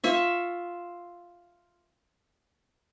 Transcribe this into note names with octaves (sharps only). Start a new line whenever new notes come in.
F4 E5 C#6